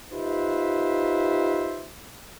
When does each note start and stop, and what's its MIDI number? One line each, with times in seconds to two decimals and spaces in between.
0.12 1.91 63
0.12 1.91 65
0.12 1.91 67
0.12 1.91 71
0.12 1.91 72
0.12 1.91 76